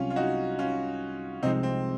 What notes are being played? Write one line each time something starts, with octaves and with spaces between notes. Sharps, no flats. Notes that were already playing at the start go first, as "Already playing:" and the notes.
Already playing: C2 C3 F#3 C#4 F4
F4
D#4 F#4
C#4 F4
C2 C3 F3 G#3 C4 D#4
C4